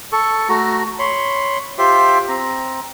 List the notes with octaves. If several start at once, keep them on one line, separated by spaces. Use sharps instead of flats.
A4 C#6
A3 F#4 A#5
C#5 B5 C6
F4 G4 C5 E5
C4 A#5